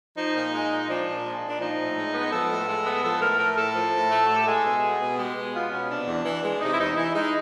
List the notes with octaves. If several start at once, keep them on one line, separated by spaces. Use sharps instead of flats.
F3 D#4
A#2
G#3
A#2
F3 D4
A#2
G#3
A#2
D4
F3 D#4
A2
G#3
B3
F3 A4
A2
G#3
B3
F3 A4
B4
A2 A#4
A3 A#4
A2 A4
F3
A2
A3
F#4
A2
G4
G#3 G#4
B2
B3
B2
G#3 G4
B2
B3 F4
B2 C#4
C3 D4
E2
E3
G#3
C3 D#4
E4
E2 D#4
E3 E4
G#3 D#4